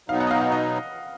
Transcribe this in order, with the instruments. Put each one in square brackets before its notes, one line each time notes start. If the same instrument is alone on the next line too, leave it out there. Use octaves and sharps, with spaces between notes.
[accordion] B2 F#3 B3 D#4 [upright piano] F5
[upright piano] F#5
D#5
F5
F5
D#5